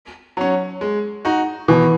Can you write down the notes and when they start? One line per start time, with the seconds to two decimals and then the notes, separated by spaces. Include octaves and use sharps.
0.37 F#3 C#4
0.81 G#3
1.25 D#4 F#4
1.68 B2 E3